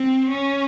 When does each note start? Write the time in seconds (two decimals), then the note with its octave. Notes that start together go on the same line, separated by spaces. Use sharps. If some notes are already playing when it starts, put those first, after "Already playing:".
Already playing: C4
0.30 C#4